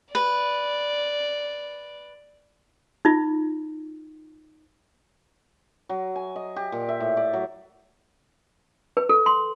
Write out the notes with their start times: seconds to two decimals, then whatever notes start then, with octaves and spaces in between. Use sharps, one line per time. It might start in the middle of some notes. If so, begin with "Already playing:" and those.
0.15 B4 D5
3.05 D#4 F4
5.89 F#3
6.16 G#5
6.36 D#5
6.56 G4
6.72 A#2
6.89 E5
7.00 A2
7.17 D5
7.33 F#3
8.97 B4
9.09 A4
9.26 C6